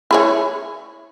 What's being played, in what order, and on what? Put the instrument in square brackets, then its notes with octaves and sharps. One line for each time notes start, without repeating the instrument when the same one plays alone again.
[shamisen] E4 G#4 C#5